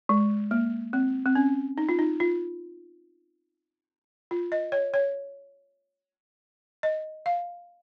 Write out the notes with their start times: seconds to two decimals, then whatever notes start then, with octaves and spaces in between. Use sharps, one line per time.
0.09 G#3
0.51 A#3
0.93 C4
1.26 C4
1.35 C#4
1.78 D#4
1.89 F4
1.99 D#4
2.20 F4
4.31 F4
4.52 D#5
4.72 C#5
4.94 C#5
6.83 D#5
7.26 F5